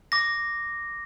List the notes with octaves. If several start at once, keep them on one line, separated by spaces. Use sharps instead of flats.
D6 A#6